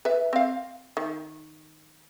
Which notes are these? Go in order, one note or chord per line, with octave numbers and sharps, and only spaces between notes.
B4 E5
C4 F5
D#3